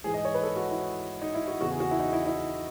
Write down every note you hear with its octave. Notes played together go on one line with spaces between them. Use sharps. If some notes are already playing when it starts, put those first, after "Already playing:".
G#2 E3 G#4
D#5
C#5
B4
A4
F#4
E4
D#4
E4
F#4
E2 C#3 E3 F#4
G#4
F#4
E4
D#4
E4
E4